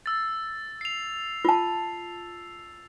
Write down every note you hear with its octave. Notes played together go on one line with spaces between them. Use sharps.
E6 A6
C7 F7
F4 A5